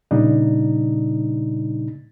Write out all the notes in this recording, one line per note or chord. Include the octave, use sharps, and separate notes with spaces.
A#2 C#3 G3 D4 D#4